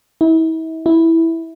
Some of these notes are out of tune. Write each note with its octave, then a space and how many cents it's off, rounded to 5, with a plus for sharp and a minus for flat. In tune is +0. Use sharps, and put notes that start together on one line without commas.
E4 -40
E4 -5